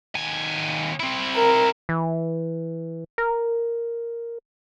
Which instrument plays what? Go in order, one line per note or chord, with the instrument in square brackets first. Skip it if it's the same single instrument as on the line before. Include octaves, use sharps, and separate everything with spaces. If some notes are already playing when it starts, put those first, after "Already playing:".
[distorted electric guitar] D#2 G#5
C4 E4
[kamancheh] A#4
[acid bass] E3
A#4